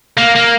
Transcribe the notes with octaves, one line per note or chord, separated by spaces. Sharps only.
A#3
A#3